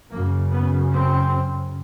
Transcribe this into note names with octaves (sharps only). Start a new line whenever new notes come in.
F#2 C#3 A#3
B3
C4